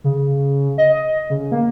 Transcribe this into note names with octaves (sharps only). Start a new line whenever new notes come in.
C#3
D#5
C#3
A#3